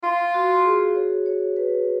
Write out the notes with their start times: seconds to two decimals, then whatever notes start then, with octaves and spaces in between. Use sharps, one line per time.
0.03 F4
0.34 F#4
0.65 G#4
0.95 C#5
1.26 C#5
1.57 B4